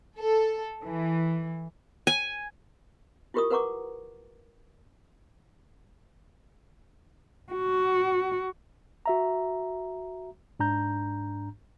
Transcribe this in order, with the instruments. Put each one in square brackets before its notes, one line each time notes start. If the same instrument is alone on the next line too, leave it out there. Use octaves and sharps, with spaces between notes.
[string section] A4
E3
[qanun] G#5
[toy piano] E4 F4 G4 A#4 C#6 D#6
A#4 B4 F#5 A#5 C#6 D6
[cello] F#4
[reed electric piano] F#4 E5 A#5
G#2 D4 A#5 G6